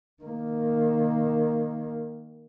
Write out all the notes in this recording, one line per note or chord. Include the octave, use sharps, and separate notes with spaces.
D#3 A#3